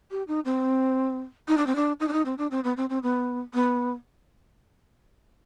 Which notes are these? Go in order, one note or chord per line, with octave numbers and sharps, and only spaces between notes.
G4
D#4
C4
D#4
D4
C4
D4
D#4
D4
D#4
C4
D4
C4
B3
C4
C4
B3
B3